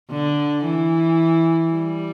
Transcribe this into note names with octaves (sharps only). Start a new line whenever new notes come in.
D3
E3
G3